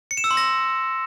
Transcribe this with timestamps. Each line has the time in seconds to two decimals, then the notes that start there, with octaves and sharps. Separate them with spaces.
0.11 C#7
0.17 E7
0.24 E6
0.31 C6
0.37 A#6